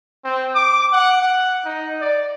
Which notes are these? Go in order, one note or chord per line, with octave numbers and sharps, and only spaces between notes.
C4
D6
F#5
F#5
D#4
D5